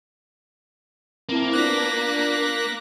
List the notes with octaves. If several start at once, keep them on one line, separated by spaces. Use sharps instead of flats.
A#3 C4 E4 A5
B3 D4 F4 F#6 A#6 B6